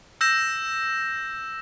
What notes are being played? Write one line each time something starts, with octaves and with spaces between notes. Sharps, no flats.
E6 G6 A#6 E7